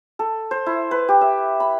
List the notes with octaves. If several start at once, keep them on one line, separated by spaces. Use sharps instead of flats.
A4
C5
E4
B4
G4
E5
B5